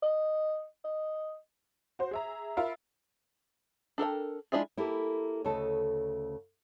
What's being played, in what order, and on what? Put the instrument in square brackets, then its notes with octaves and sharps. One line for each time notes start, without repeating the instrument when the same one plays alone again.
[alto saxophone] D#5
D#5
[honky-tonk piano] F#4 C5
G#4 E5 A#5
F4 A#4 E5 F5 B5
[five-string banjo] D4 A4 A#4 G5
G#3 D4 E4 F4 G#4
[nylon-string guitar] A#3 E4 G4 A4
D2 C#3 A3 A4 D#5